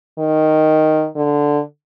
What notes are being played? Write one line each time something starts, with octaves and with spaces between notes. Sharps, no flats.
D#3
D3